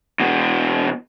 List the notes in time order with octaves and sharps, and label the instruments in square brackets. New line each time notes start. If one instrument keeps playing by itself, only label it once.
[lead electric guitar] E2 B2